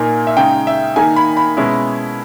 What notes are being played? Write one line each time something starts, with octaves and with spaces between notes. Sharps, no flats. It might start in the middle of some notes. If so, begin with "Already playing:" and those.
Already playing: A#2 A#3 D#4 G#5
E5
C#3 G#3 D#4 G5
E5
D#3 A#3 D#4 G#5
B5
B5
B2 G#3 C#4 E4